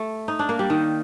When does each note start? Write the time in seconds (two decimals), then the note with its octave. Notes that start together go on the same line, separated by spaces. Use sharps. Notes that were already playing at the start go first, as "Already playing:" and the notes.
Already playing: A3
0.28 D#4
0.39 D4
0.49 A#3
0.59 G3
0.70 D#3